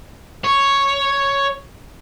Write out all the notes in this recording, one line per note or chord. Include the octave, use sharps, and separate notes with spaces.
C#5